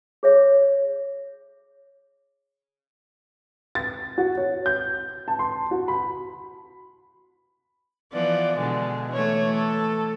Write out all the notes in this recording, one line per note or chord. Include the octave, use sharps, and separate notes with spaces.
G#4 C#5 E5
A6
F#4
C#5
G6
A5
C6
F#4
B5
E3 F3 B3 D5
B2 D3 G#3
E3 A3 C#5
A4